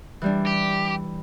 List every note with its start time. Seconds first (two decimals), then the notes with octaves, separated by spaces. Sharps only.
0.22 E3 G3 D4
0.47 G4